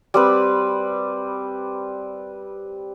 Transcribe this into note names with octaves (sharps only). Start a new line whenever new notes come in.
G3 C4 B4